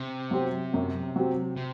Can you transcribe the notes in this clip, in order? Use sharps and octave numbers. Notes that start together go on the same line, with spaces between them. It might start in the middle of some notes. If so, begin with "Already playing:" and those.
Already playing: C3
F#3 C4 G4
F#2
F#3 C4 G4
C3